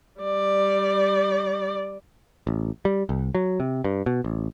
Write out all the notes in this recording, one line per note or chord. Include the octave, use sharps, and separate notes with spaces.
G3 D5
A1
G3
C2
F#3
C3
G2
B2
A1